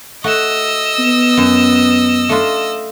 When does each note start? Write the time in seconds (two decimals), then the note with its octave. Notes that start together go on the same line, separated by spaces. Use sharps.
0.24 A3 F#4 D#5 E6
0.99 B3
1.37 F#2
2.29 A3 D4 F4